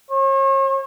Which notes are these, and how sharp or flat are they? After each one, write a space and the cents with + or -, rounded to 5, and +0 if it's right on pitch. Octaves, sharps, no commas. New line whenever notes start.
C#5 -40